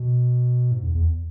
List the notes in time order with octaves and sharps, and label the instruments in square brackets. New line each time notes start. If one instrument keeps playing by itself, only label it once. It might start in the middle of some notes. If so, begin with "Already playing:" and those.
Already playing: [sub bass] B2
G#2
E2
E2